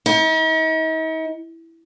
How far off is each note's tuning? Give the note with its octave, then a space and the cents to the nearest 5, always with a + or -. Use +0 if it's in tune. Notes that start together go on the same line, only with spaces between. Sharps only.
D#4 +45